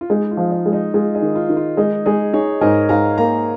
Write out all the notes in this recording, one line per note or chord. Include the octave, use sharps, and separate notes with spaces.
F4
G#3 D#4
F4
F3
D#4
G#3
D#4
G#3 F4
D#4 G#4
D#3
F4
D#3
F4
G#3 D#4
G#3 D#4 G#4
D#4 G#4 C#5
G#2 A#4 D#5
G#2 F5 A#5
A#3 F5 A#5